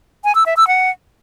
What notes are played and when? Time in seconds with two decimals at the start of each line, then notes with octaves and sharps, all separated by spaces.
0.24 G#5
0.35 E6
0.46 E5
0.57 E6
0.68 F#5